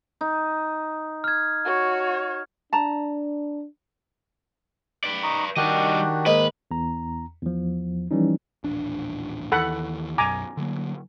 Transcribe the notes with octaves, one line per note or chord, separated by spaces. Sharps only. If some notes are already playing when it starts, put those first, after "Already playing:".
D#4
F6 G#6
F#4 C#5
D4 A5 A#5
B4 D5
D#4 A#5 C#6
D#3 G3 D4 F#4 G4 D#5
G#2 A#3 B4 D#5
E2 A#5
E2 F3
E3 F3 G3 C#4 D#4
D#1 A1 D4
D#2 D#3 E3 A4 F#5 B5
B1 F#2 G#5 A#5 D6
D3 F#3 A#3